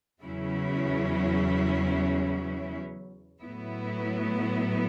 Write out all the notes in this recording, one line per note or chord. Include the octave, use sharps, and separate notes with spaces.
E2 C#3 F#3 C#4 E4
A2 F#3 B3 E4